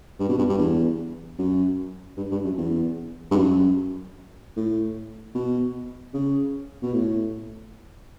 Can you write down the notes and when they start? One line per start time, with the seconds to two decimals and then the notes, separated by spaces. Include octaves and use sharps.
0.19 G2
0.29 B2
0.38 G2
0.49 G2
0.58 E2
1.38 F#2
2.17 G2
2.31 G2
2.44 F#2
2.58 E2
3.31 G2
3.36 F#2
4.56 A2
5.35 B2
6.14 C#3
6.82 B2
6.94 A2